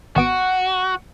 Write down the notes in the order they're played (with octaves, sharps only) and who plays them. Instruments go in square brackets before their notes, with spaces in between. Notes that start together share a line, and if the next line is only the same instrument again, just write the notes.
[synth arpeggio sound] G#1 B3 D7 [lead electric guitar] F#4